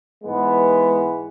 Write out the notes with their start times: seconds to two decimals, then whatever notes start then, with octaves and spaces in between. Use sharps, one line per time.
0.23 G#2 E3 G#3 B3